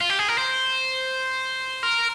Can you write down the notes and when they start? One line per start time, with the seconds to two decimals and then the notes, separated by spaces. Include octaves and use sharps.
0.01 F4
0.10 G4
0.19 G#4
0.28 A#4
0.38 C5
1.83 A#4